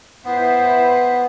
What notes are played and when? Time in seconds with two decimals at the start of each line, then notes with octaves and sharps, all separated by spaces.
0.25 B3 E4 B4 C5